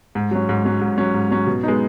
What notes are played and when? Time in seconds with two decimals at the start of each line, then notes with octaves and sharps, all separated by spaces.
0.15 G#2
0.31 F#3 C#4
0.49 G#2
0.65 F#3 C#4
0.81 G#2
0.98 F#3 C#4
1.14 G#2
1.31 F#3 C#4
1.47 B2
1.63 G#3 B3 D#4